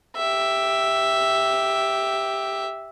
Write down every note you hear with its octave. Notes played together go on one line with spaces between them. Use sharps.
G4 E5